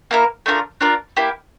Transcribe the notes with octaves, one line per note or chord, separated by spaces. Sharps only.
A#3 E4 A#4
A3 D4 F4 A#4
D4 F4 A#4 D5
A#3 E4 G4